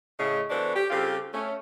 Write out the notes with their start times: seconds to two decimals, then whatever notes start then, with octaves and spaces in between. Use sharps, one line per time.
0.19 A2 C#3 D#5
0.50 E3 B3 D4 F#4 A4 C5
0.75 G4
0.90 C#3 G3 C4 F4 G4 A4
1.33 A3 C#4